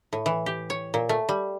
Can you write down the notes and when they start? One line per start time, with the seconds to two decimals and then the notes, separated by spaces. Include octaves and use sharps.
0.13 A2
0.26 E3
0.46 G4
0.70 C#5
0.94 A#2
1.09 A3
1.29 G3